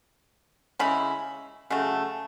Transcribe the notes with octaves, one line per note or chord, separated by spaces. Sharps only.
C#3 G#3 C#4 E4 B5
C#3 F#3 A3